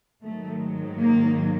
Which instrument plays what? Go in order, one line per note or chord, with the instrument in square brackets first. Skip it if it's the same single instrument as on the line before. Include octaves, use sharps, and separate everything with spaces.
[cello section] G#2 D#3 F#3 A3
A#3